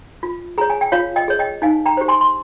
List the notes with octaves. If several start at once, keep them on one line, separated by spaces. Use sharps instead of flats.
F4
G#4 C#5 A#5
G#5
G5
F4 C#5 F5
D#5 G5
G#4 C#5
D#5 G5
D#4 F5 G#5
G5 A#5
G4 C5
G#5 C6
C6